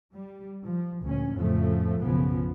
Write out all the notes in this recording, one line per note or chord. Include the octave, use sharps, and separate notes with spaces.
G3
F3
D2 A#2 C#4
F2 A2 C#3 F3 A3
B1 F#2 C#3 F3 B3